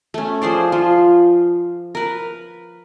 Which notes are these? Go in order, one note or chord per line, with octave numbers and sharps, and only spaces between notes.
A3 C#4
F3 G#4 C5 D5
F3 F4
A#4 B4